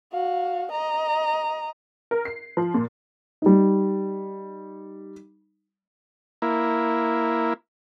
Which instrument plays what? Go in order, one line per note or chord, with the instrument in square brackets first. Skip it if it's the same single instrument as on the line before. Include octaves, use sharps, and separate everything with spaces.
[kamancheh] F#4 F5
D#5 A#5
[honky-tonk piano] A#4
C7
F3
A#2
[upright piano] G3 D#4
[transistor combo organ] A#3 E4